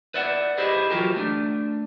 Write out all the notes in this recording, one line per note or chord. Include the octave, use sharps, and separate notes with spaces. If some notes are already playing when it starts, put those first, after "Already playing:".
B4 D5 E5 F#5
E4 G4 G#4 B4 C5 D#5
E3 F#3 F4 G4 A#4
A3 D4